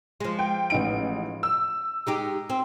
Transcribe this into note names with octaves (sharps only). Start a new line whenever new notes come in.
F3 G#3
G5
A1 D#4 D7
E6
G#3 D#4 G4
C4